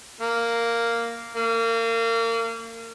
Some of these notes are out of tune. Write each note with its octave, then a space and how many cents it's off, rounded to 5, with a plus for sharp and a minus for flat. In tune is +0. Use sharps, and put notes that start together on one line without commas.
A#3 -5
A#3 -30